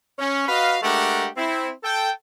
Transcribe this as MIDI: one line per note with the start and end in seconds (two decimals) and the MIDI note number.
0.18 0.47 61
0.48 0.77 66
0.48 0.77 71
0.48 0.77 75
0.48 0.77 77
0.82 1.27 56
0.82 1.27 57
0.82 1.27 62
0.82 1.27 67
0.82 1.27 70
0.82 1.27 78
1.37 1.70 60
1.37 1.70 64
1.83 2.09 69
1.83 2.09 79